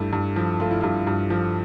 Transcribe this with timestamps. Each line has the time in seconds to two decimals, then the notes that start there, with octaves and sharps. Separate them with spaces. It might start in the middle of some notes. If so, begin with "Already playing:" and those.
Already playing: G2 A3 E4
0.13 G2
0.36 F3
0.60 A3 F4
0.71 E4
0.81 G2 F4
1.07 G2
1.30 F3